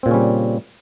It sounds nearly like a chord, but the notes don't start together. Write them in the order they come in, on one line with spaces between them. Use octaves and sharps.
C4 A#2 C#3 C#4 G3